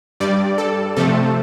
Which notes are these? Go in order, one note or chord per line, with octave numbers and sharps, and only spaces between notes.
G2 G3 D5
A4
C3 F3 A3 A4